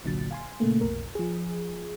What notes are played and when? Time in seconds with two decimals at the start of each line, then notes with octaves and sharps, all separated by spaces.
0.04 G1 C2 A#2 D3 F#3 A6
0.31 F5 G#5 C6
0.60 A#2 C#3 A3 A#3
0.81 B1 F2 A#4
1.15 F3 G#4